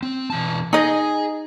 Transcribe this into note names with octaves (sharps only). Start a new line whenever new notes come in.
C4
B2 E3 A5
D#4 G#4 D#5 G#5